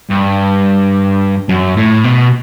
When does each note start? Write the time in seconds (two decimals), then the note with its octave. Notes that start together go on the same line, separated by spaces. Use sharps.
0.10 G2
1.49 F#2
1.77 A2
2.04 B2